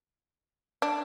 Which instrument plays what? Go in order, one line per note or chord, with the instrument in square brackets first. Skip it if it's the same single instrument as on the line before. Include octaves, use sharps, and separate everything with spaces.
[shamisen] D4